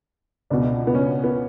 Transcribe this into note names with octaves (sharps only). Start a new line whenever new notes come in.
C#2 B2 D4
B3
C#4
B3